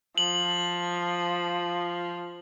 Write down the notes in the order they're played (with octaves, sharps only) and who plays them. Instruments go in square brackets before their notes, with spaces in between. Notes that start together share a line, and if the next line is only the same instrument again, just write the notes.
[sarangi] F3 [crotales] F#7